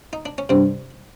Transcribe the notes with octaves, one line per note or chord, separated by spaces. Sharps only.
D#4
D4
C#4
G2 C3 C4